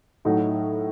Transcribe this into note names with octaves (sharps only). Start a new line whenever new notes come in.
A2 F#3 A3 D#4 F#4